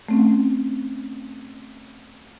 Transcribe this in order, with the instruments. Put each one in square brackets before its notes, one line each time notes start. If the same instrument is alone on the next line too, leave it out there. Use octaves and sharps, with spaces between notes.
[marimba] A3 C4 C#4